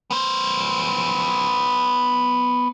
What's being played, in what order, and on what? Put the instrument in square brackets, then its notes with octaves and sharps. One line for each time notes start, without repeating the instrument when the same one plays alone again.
[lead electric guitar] B3 C5